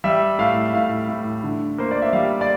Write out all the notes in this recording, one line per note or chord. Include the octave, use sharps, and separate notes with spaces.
G3 E5
A2 F5
A2 F5
A2
D3
A#3 C5
D5
E5
G3 F5
D5